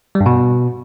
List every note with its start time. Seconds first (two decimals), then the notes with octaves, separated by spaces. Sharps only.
0.15 G3
0.21 G2
0.26 B2